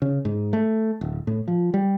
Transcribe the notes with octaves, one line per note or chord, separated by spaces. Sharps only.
C#3
G#2
A3
D1
A2
F3
G3